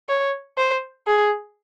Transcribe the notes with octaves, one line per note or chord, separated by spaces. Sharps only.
C#5
C5
G#4